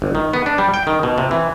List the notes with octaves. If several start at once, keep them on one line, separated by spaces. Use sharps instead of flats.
G1
D#3
B3
D4
G3
G5
D#3
B2
C3
E3